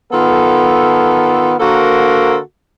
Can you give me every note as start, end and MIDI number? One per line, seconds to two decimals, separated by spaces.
0.12 1.54 51
0.12 1.54 59
0.12 1.54 65
0.12 1.54 69
1.60 2.38 50
1.60 2.38 58
1.60 2.38 66
1.60 2.38 69
1.60 2.38 70
1.60 2.38 72